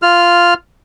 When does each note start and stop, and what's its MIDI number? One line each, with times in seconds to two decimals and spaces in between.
0.02 0.54 65
0.02 0.54 89